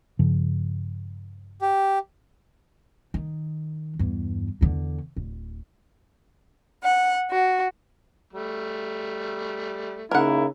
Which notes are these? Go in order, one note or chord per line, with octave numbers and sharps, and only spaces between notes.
G2 C#3 F3
G4
D#3
E2 G2
E2 D3
D1
F#5
F#4
G3 A3
C#3 A#3 D#4 E4 A#4 F#5